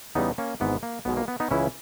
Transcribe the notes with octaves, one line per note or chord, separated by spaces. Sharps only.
E2 C#3 G3 B3 D#4
A#3 C#4
G#1 G#2 E3 B3
A#3
B1 B2 G#3 B3
A#3
B3
B3 D#4
C#2 C#3 E3 C#4 E4